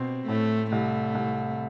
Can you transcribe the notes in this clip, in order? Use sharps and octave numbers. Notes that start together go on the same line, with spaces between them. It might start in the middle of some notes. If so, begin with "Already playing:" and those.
Already playing: B2 C4
A2 A3
C2 A3
C2